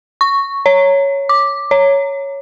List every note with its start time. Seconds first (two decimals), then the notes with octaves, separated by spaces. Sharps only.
0.21 C#6
0.66 C#5
1.29 D6
1.71 C#5